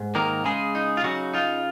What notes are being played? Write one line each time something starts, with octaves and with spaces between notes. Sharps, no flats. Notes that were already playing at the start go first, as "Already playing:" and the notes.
Already playing: G#2
D#3 A#3 A#4
C#3 G#3 G#4
D#4
F4
C#3 F#3 F#4
D#4 F4